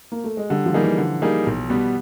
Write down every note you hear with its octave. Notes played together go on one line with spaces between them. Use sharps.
A#3
A3
G#3
D3 G3
F3
G3 A#3 D#4 G#4
E3
D3
G3 A#3 D#4 G#4
B1
B2 G3 B3